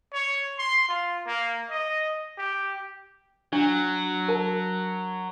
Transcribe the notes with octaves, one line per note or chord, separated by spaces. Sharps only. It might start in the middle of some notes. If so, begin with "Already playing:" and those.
C#5
C6
F4
A#3
D#5
G4
F#3 D4
A#4 A5